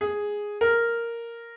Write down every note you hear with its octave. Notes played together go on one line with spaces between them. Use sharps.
G#4
A#4